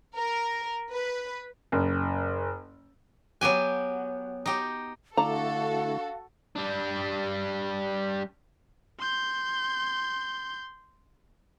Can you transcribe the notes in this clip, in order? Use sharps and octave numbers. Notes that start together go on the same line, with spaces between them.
A#4
B4
F#1
F#3 B3 G4 G#5
D#4 G4
D3 A3 D4 E4 F#4 A4 F5 A#5
G3 D4
C6 G6